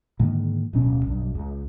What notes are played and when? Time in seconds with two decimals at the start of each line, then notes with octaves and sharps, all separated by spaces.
0.19 G#2 D3 D#3 A#3
0.73 D1 B2 C#4
1.06 B1 G2
1.35 C#2